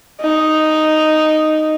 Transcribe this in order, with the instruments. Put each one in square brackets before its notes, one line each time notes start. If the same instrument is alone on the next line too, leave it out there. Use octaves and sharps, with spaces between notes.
[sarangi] D#4